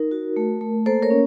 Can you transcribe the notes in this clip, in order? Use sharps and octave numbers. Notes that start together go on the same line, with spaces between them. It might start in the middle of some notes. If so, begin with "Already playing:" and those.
Already playing: D#4 A#4
F#4
A3
A3
A#3 A4 C5
A#4 C#5
C#4